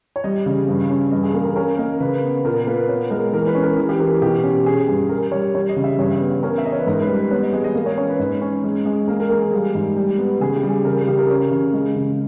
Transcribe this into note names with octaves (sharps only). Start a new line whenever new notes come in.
C#5
G3 D#5
C#3
G2
C#4
G2 D#5
G#4
A#3 G#4
A#4
C#4 A#4
A#3 D#5
C#3 B4
B3
A#2 A#4
A#3 B4
B3 C#5
G#3 A#4
E3 A#4
B4
C#4
A#4
E3 G#4
G4
E3 A#4
B2 G4
C#4
C#4 G#4
G2 G#4
G3 A#4
G3 C#5
G3 C#5
D#5
C#3
E5
G2 C#5
B3
C#4 A#4
E5
C#4 D#5
C#5
B4
G#2 A#4
B4
G3
B4
B3 C#5
D#5
G#3 D#5
D#5
A#3
C#5
C#4 C#5
B4
G#2
C#4
G#3
G#3
A#3 A#4
A#4
A#3 G#4
G#4
G3 G#4
G#2
G3
B3
C#3 G#4
G4
G3
G#4
C#3 A#4
G#4
C#3 G4
A#4
C#4
C#3
G#3
C#3